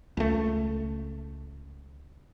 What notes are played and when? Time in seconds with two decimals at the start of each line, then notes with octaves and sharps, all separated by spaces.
0.17 C#2 A3